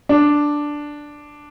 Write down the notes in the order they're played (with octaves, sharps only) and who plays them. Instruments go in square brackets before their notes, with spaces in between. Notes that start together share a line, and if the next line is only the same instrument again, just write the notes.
[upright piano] D4